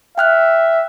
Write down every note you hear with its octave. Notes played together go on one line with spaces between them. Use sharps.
E5 G5 F6 F#6